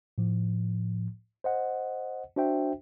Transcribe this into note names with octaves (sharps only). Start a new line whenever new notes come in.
A2 F3
C5 D#5 F#5
D4 F#4 C5 E5 G5